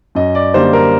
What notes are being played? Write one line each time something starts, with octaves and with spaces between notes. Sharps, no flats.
F#2 D#5
D5
D3 G3 A#3 C5
A#4